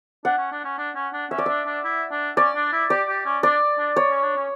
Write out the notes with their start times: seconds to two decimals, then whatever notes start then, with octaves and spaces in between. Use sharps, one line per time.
0.25 D4 F#5
0.38 C#4
0.52 D4
0.65 C#4
0.78 D4
0.95 C#4
1.13 D4
1.31 C#4 E5
1.38 D5
1.46 D4 E5
1.66 D4
1.84 E4
2.11 D4
2.37 C#4 D5
2.55 D4
2.72 E4
2.90 G4 D5
3.08 G4
3.26 C#4
3.43 D4 D5
3.78 D4
3.96 C#5
4.10 C#4
4.23 D4
4.36 C#4